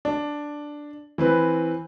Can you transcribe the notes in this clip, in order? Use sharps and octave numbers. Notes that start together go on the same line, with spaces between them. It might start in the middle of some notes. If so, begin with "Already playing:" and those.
D4
E3 C4 B4